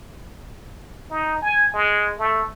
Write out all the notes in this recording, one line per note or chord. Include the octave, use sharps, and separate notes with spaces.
D#4
G#5
G#3
A3